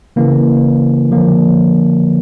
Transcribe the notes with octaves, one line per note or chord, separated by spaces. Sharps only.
C#3 E3 A#3
D3 F3 A#3